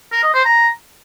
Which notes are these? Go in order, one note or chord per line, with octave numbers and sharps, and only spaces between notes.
A#4
D#5
C5
A#5